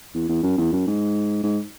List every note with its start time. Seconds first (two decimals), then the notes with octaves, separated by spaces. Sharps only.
0.15 E2
0.29 E2
0.43 F#2
0.58 E2
0.73 F#2
0.87 G#2
1.43 G#2